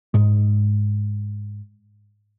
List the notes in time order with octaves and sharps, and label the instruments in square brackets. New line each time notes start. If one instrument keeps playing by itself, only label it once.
[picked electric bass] G#2 G#3